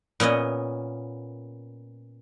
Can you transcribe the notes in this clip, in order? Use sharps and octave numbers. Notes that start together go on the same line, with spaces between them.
A#2 B3 C#4 D#5